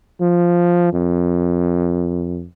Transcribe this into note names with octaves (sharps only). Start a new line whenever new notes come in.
F3
F2